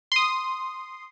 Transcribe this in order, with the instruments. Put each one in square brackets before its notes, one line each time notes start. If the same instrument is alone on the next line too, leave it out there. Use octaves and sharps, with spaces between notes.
[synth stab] C6 D#6